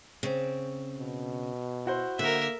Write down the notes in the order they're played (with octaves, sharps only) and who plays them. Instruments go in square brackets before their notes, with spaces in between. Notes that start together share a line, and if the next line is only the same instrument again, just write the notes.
[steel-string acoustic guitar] C#3 C4
[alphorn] B2
[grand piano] E4 F#4 C5
[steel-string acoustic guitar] D3 [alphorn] A#3 [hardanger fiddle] A#4 E5